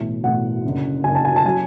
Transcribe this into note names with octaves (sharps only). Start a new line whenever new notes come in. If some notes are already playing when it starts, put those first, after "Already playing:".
Already playing: B1 A2 E3
B1 A2 E3 F#5
F#1 F#2 D3
F#1 F#2 D3 G#5
A5
G#5
A5
F#3 G#5